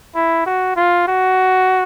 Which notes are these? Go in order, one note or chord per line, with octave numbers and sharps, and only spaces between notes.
E4
F#4
F4
F#4